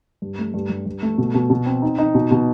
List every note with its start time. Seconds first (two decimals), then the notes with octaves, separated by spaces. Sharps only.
0.22 G2
0.39 A3
0.54 G2
0.70 G2
0.86 G2
1.02 A3
1.18 B2
1.34 B2
1.50 B2
1.66 C4
1.82 D#4
1.98 D#4
2.15 B2
2.31 B2